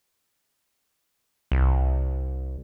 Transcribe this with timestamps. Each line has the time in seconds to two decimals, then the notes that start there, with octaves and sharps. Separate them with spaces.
1.52 C2